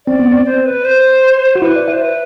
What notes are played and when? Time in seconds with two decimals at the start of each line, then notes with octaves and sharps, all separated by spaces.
0.06 C4 D5
0.20 B3
0.31 C4
0.45 C5
0.65 B4
0.85 C5
1.55 F#4
1.62 E4 B4
1.76 D5
1.88 C5 E5
2.02 B4